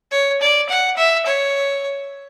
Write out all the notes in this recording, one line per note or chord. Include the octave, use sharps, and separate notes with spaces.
C#5
D5
F#5
E5
C#5